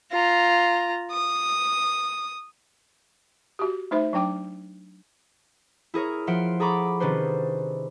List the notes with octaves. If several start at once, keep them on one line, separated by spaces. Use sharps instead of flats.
F4 A#5
D#6
F#4 G4
A3 D#4 C5 E5
F#3 D4 G5 D6
E4 G#4 A#4 C#5
F3 E5 F#5 C6 D7
G#4 A4 A#5 B5 C#6 D6
C3 D#3 C#4 D4 B4 C5